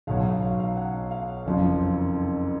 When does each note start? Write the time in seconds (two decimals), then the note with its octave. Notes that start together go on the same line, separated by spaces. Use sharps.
0.07 B1 B2 F#3 F5
0.25 F5
0.42 F5
0.59 F5
0.77 F#5
1.11 F5
1.45 F#1 F2 F3